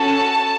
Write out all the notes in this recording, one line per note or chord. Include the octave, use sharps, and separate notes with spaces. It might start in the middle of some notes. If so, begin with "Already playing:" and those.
Already playing: C#4 F#4 A4 A5